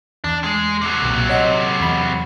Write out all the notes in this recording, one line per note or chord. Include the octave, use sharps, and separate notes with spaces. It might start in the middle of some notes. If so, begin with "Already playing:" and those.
E2 D4
G#3
C3 F#3
B1 A#2
C#5 D#5 F#5
E2 B5